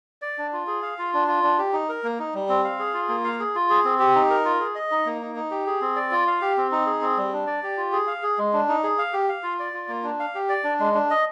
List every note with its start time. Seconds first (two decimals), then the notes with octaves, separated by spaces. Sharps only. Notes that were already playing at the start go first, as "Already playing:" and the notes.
0.22 D5
0.38 D4
0.53 F4
0.67 G#4
0.82 F5
0.99 F4
1.14 D4
1.28 F4
1.44 D4
1.58 G4
1.73 D#4
1.89 A#4
2.04 A#3
2.19 D#4
2.34 G3
2.49 C4
2.64 F5
2.79 G#4
2.94 F4
3.09 A#3
3.24 F5
3.39 G#4
3.55 F4
3.70 G#4
3.85 C4
3.99 G4
4.15 D#4
4.30 A#4
4.45 F4
4.60 G#4
4.75 D#5
4.91 D#4
5.06 A#3
5.21 D#4
5.36 D#4
5.51 G4
5.67 G#4
5.81 C4
5.96 D5
6.11 F4
6.27 F5
6.42 G4
6.57 C4
6.72 D#4
6.86 G#4
7.01 C4
7.17 G3
7.33 D4
7.47 D5
7.63 G4
7.77 F4
7.92 G#4
8.07 F5
8.23 G#4
8.38 G#3
8.53 D4
8.69 D#4
8.84 G#4
8.98 F5
9.13 G4
9.29 F5
9.43 F4
9.59 D5
9.74 F4
9.89 A#3
10.04 D4
10.20 F5
10.35 G4
10.49 D5
10.64 D4
10.80 G#3
10.95 D4
11.11 D#5